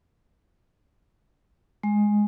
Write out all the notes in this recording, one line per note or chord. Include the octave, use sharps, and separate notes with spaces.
G#3